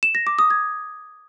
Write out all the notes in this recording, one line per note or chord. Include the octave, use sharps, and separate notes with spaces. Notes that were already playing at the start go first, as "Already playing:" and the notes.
E7
A#6
D6
D#6
G#6